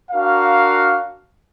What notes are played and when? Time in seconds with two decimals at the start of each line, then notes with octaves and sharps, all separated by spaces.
0.12 D4 F#4 A#4 F5